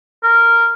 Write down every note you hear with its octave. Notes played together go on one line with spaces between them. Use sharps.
A#4